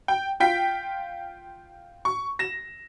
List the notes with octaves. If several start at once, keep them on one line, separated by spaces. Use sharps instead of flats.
G5
F4 G5 B6
C#6
A#6 E7